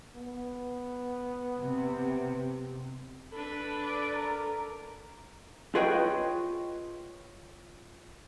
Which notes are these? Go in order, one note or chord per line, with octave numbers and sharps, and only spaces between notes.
B3
C3
D4 A4 B4 B5
D5
A#4
F4 G#4 B4 C#5 D#5 G5